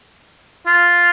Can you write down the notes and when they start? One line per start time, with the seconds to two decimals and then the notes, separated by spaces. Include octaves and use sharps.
0.66 F4